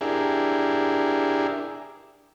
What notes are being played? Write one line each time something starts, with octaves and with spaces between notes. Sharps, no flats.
D4 E4 G4 G#4 A#4